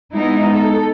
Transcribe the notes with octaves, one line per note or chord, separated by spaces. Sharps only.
G#3 B3 D#4 E4
A4